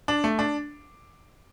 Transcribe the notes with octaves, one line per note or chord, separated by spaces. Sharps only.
D4
A3
D4